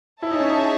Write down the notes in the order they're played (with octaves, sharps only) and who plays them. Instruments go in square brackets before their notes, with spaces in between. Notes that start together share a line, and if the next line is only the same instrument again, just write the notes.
[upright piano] E4 [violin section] G#4 C#5 E5 A5
[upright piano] D#4
C#4
D#4